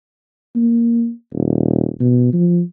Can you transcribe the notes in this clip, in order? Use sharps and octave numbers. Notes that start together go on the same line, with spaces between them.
A#3
D#1
B2
F3